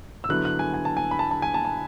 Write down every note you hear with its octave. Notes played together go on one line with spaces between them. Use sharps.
E6
D3 F#3 B3 E4 F#6
F#6
G#5
G#5
A5
G#5
B5
A5
A5
G#5
A5
A5